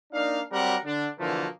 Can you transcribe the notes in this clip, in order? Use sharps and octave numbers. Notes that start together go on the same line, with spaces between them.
A#3 D4 D#4 D5 F5
F#3 G3 C4 G4 A#4 F#5
D3 D4
B2 D3 E3 F3 A3 A#3